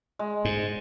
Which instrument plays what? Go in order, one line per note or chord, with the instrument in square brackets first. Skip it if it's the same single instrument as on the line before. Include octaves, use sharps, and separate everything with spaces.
[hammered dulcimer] G#3
[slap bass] G#2